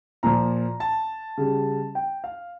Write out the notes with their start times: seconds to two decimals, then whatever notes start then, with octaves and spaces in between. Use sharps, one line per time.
0.23 A#2 F3 A#5
0.80 A5
1.38 C#3 G3
1.95 G5
2.24 F5